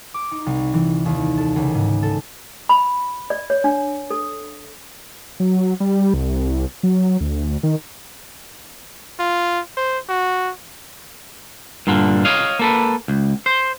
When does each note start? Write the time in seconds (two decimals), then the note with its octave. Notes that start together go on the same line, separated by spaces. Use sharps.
0.14 D6
0.32 D#4
0.46 C2
0.74 E3
1.06 D#2
1.38 A4
1.56 C#2
1.74 G#2
2.03 A4
2.69 B5
3.30 D5
3.50 C#5
3.64 D4
4.10 A4
5.40 F#3
5.80 G3
6.14 C2
6.83 F#3
7.21 D2
7.63 D#3
9.20 F4
9.77 C5
10.09 F#4
11.87 G2 A#2 D3
12.25 C#5 D#5 F5
12.59 A#3 A4 B4
13.08 C#2
13.46 C5